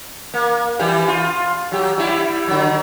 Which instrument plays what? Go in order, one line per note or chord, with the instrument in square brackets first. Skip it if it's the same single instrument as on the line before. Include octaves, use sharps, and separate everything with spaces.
[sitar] A#3
E3 G3 G4
F4
F#3 G4
G3 E4
D3 F#3